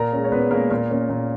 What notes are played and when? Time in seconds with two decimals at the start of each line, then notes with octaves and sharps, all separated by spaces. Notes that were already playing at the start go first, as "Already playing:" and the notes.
Already playing: A#2 A#4 A#5
0.12 G#3 C#4
0.24 C#5
0.32 A#2 B3 B4
0.51 G#3 A#3 C#4 A#4
0.71 A#2 A#3 A#4
0.91 A#3 C#4
1.10 A#2